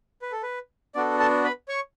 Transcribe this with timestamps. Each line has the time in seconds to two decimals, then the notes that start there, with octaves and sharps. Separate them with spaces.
0.22 B4
0.32 A4
0.43 B4
0.95 B3 D4 F#4 A4 D5
1.19 A4 A5
1.44 B4 B5
1.68 C#5 C#6